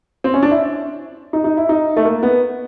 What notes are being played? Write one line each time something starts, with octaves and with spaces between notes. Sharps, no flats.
C4
C#4
D4
E4
D#4
D#4
E4
D#4
A3
A#3
B3